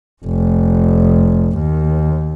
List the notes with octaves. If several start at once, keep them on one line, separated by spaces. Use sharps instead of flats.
F1
D#2